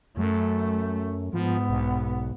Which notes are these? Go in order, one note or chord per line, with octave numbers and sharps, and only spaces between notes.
F#2 A3
G#2 F3 B3
B1